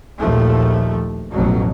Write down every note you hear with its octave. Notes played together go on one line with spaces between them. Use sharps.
A#1 D#2 F3 A3
A1 F2 B2 F#3